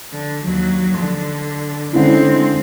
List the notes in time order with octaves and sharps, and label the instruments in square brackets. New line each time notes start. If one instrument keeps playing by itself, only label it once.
[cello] D3
D#2 F#3
D3
[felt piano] D3 C#4 E4 [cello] G#3 C4